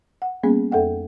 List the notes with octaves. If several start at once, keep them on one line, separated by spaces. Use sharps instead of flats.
F#5
G3 A#3 B3 C#4 G#4
F2 A4 E5 F#5 G5